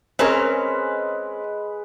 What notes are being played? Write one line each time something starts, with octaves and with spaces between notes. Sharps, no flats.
G#3 C4 C#4 A#4 B4